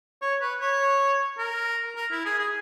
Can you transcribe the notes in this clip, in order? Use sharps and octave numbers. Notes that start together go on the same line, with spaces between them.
C#5
B4
C#5
A#4
A#4
E4
G#4
G#4